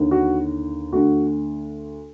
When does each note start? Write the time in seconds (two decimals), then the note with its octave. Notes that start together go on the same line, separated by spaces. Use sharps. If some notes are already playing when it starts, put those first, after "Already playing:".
Already playing: D#2 D3
0.11 F#4
0.93 D2 D3 F#4